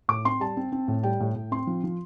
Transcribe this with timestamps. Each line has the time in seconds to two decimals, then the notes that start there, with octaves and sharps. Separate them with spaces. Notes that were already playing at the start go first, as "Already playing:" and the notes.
0.09 A2 D6
0.25 C4 C6
0.40 G3 A5
0.57 C4
0.72 C4
0.88 A2
1.03 G3 G5
1.20 A2
1.35 A2
1.51 C4 C6
1.67 F3
1.84 F3